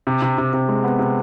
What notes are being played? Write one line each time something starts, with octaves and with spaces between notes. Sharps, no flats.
C3
C3
C3
C3
G#3
B3
C3